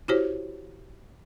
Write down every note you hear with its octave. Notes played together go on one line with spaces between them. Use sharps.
E4 F#4 G4 C5 C#5